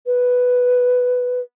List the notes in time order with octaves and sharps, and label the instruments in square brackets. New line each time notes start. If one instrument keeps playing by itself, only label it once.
[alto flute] B4